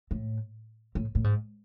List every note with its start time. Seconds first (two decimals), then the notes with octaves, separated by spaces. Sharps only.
0.11 A2
0.95 A2
1.15 A2
1.24 G#2